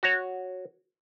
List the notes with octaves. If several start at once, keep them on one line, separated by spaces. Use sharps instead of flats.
F#4 C#5